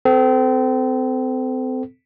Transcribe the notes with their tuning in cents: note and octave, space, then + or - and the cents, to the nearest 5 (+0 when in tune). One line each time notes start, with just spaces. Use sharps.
C4 -30 A4 +0